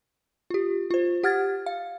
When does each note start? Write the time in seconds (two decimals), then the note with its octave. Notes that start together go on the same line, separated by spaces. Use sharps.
0.50 F4 G4
0.91 F4 C5
1.23 G4 F#5 F6 G#6 A6
1.66 F5